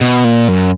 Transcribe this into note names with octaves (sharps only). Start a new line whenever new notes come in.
B2
A#2
F#2